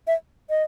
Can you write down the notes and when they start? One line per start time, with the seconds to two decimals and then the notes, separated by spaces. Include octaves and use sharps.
0.07 E5
0.50 D#5